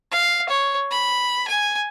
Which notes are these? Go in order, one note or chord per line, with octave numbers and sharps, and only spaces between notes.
F5
C#5
B5
G#5